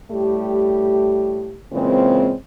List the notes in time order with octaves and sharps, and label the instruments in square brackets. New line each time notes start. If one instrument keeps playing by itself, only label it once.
[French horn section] A2 G3 A3 G4
A#2 C#3 E3 G#3 C4